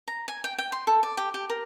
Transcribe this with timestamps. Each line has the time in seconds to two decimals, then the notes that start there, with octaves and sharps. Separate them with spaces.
0.08 A#5
0.28 G#5
0.44 G5
0.59 G5
0.72 C6
0.87 A4
1.03 D5
1.17 G4
1.34 G4
1.50 A#4